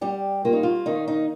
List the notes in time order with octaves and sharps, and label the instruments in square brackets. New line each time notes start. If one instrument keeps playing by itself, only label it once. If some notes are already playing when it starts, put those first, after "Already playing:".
[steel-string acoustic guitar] G3 G4
A#3 F4
D#4
F4
D#3 D#4
D#4